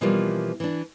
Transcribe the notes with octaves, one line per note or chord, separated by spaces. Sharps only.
B2 E3 F3 G3 A#3 F4
E3 D4